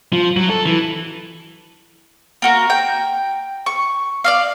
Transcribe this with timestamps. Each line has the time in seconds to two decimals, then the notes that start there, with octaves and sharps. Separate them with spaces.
0.13 F3
0.37 F#3
0.50 A4
0.66 E3
2.42 A#3 F#4 A#4
2.70 G5
3.66 C#6
4.24 D5 D#5 F5